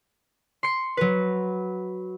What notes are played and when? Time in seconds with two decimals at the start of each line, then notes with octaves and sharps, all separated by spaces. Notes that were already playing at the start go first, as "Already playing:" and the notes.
0.63 C6 C#7
0.97 F#3 B4